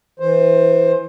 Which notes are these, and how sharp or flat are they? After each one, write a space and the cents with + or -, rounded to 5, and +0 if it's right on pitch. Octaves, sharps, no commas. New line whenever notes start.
E3 +0 C5 +15